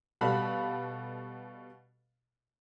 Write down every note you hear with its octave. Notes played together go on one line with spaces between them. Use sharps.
B2 G3 F#4 A4 F5 B5